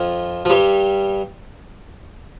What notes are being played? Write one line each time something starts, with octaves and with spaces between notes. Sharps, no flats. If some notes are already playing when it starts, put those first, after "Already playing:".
Already playing: F2 F3
F3
G2 G3